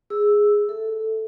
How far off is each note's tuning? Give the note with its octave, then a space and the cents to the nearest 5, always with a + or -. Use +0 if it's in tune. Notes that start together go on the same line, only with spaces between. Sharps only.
G#4 +0 E6 +0
A4 +0 E5 +0